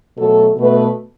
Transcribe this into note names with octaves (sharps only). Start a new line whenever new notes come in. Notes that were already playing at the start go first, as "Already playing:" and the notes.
B2 F#3 A3 A4
B2 A3 B4